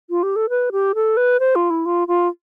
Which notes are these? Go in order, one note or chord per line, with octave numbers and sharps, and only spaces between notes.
F4
G4
A4
B4
G4
A4
B4
C5
F4
E4
F4
F4